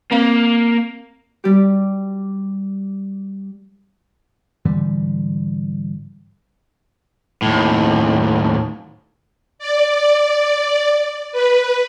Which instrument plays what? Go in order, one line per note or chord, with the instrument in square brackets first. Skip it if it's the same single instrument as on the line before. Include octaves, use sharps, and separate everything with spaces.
[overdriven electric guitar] A#3 [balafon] C4 F5
[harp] G3 G4
[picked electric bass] G#2 D3 E3 G3
[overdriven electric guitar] D#2 A2
[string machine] D5
B4